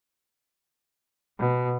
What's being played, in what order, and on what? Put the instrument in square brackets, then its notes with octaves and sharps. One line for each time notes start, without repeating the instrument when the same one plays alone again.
[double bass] B2